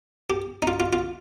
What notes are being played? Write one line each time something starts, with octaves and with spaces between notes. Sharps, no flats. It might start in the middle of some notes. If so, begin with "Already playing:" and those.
G4
D#4
F4
F4
F4